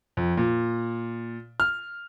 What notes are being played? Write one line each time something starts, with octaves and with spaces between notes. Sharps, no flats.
F2
A#2
F6